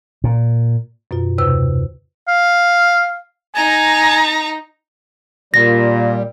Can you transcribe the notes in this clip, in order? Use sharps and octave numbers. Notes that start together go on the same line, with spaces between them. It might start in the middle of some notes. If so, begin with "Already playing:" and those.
A#2
F#2 B2 F4
D#2 C3 B4 E6
F5
D#4 G#5 A#5
A#2 G3 A#6